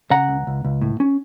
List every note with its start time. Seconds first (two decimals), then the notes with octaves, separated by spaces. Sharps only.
0.11 C#3 F#5 A#5
0.29 C#2
0.47 C#2
0.65 C#2
0.82 A2
1.00 C#4